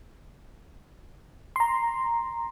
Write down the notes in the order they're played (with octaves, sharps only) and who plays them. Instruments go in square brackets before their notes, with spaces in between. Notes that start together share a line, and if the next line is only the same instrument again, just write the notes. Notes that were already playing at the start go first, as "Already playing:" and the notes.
[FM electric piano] A#5 C6